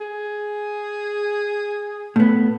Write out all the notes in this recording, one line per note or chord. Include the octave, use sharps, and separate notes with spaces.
G#4
A2 B3